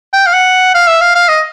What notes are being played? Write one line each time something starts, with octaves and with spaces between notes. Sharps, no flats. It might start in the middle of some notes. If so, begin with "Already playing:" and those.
G5
F5
F#5
F5
E5
F5
F5
D#5